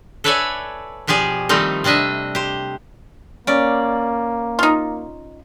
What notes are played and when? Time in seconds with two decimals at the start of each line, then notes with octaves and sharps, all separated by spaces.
0.24 A4 B4 C#5 D5 E5 G#5
1.07 B2 F3 G4 G#4 D5
1.49 D#3 F3 G3 A3 C4 D#4
1.84 C3 G3 D4 D#5 E5
2.35 G4 C5
3.47 A#3 C#4 D5
4.59 D#4 F4